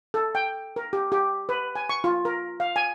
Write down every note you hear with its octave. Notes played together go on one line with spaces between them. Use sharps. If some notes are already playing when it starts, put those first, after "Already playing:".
A4
G5
A#4
G4
G4
B4
G#5
C#6
F4
A#4
F5
G#5